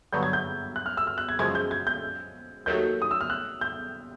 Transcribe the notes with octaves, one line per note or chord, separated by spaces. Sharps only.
G2 D3 F#3 B3 G6
G#6
G6
F#6
F6
E6
F6
F#6
G#6
F#2 C#3 F3 G#3 G#6
G6
G#6
G6
D#2 D#3 F#3 A3 G6
D#6
E6
F6
F#6
G6